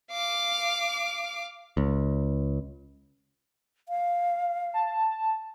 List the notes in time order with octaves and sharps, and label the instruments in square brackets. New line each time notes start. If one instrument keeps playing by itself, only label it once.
[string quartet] F5 D6
[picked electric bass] C#2
[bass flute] F5
[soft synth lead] A5